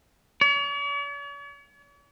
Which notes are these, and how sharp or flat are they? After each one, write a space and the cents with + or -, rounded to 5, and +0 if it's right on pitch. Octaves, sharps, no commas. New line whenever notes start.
C#5 +45